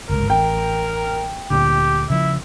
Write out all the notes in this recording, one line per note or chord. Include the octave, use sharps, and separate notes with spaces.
G1 C#2 G#2 A#4
A1 A#4 G5
D2 A#2 D3 G4
C#3 F3 E4